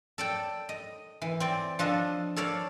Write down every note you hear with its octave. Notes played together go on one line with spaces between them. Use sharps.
A4 D5 G5
D#5
E3
C4 D5
F3 D4 A4 D#5
A4 C#5 D5 F5